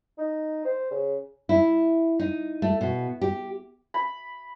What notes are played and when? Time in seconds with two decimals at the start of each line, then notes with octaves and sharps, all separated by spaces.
0.18 D#4
0.65 C5
0.91 C#3
1.49 E4
2.19 D#4
2.62 A3
2.81 B2
3.21 G4
3.94 B5